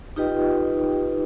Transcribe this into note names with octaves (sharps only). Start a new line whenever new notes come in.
D#4 F4 G4 B4 D#5 G5